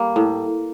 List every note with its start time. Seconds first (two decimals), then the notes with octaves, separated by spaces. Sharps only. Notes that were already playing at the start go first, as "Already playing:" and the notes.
Already playing: G3 A#3
0.16 A2